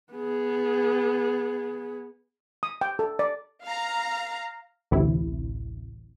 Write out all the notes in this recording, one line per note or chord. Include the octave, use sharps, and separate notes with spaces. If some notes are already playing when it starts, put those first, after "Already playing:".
B3 G#4
D#6
G5
A4
D5
F5 A#5
A1 D2 C3 E4